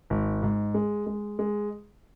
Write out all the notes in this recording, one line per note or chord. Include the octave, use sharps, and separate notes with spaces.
G#1
G#2
G#3
G#3
G#3